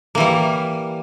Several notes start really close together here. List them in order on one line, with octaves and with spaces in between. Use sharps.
A#3 E3 G3